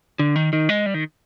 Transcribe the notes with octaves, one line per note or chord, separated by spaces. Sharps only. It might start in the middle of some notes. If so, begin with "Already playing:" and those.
D3
D#3
D#3
G#3
G3
D#3